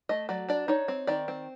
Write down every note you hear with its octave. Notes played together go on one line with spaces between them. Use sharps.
A3 D#5
F#3 D5
D4 D5
D#4 C#5
C4
D#3 D5
C4